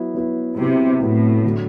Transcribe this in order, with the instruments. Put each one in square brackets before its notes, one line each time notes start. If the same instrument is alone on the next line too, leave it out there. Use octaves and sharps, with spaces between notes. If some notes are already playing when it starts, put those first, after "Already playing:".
Already playing: [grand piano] F#3 B3 E4
F#3 B3 E4
[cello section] C3 [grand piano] F#3 B3 E4
[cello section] A2 [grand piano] F#3 B3 E4
[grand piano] D3 F#3